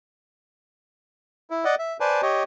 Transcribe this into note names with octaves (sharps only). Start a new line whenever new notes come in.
E4
D5 D#5 F#5
E5
B4 C5 D5 G#5 A5
G4 C#5 D#5